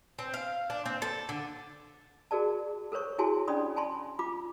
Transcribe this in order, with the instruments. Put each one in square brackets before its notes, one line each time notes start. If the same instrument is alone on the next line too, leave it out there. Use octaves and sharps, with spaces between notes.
[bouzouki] C4
F5
D4
C4
A4
D3
[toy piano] F#4 G#4 A#4 D5 A5
A4 A#4 C5 C#5 C#6
E4 F#4 G#4 G#5 A5 C6
C#4 D4 D5 B5 C6 D#6
G#5 A5 B5 C6
F4 B5 D6